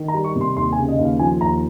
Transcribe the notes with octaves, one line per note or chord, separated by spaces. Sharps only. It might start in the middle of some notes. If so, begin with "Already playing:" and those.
Already playing: D#3
A#5
G3
C#6
C3
C6
D#2 C6
G#5
C#3
D#5
D#2
F5
F3 G#5
D#2 A#5